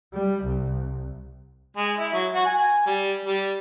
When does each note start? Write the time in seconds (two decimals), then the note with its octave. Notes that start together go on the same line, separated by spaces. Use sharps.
0.13 G3
0.45 C2
1.77 G#3
1.98 E4
2.14 F#3
2.34 F#4
2.46 G#5
2.59 G#5
2.86 G3
3.26 G3